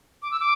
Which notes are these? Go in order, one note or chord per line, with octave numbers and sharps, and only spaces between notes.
D6
E6
D6